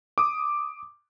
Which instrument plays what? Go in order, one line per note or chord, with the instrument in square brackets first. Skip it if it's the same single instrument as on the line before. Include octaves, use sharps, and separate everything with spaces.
[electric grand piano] D6 D#6